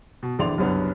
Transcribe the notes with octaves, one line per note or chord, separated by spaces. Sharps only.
B2
A#1 D3 E3 D5 C6 F7
F#1 C2 F#2 B3 C#4 D4